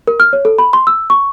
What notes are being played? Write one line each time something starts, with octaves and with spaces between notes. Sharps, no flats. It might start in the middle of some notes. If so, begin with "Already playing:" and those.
A#4
F6
C#5
A4
B5
C6
E6
C#6